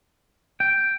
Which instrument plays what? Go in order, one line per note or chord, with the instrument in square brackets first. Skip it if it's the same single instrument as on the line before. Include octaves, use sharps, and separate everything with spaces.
[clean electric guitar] G5